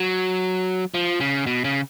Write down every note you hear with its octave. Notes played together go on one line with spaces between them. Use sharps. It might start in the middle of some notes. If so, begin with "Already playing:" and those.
Already playing: F#3
F3
C#3
B2
C#3